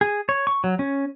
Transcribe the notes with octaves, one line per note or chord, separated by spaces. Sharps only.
G#4
C#5
C#6
F#3
C#4